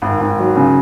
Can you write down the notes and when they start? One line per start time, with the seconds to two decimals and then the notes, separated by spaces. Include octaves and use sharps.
0.02 G#1
0.20 G#1
0.39 F#3
0.57 C#3